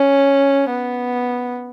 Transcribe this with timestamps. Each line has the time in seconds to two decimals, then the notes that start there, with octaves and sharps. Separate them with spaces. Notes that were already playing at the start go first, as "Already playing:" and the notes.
Already playing: C#4
0.70 B3